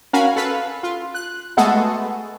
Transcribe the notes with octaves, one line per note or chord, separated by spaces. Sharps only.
C#4 F#4 A#4 F5 G#5 B5
A4 B4 F5
F4
F#6
G#3 A3 B3 F#4 G#4 A4